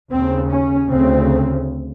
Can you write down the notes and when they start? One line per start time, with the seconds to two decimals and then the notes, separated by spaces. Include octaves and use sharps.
0.10 D#2 C#3 C4
0.50 C#4
0.90 D2 C#3 C4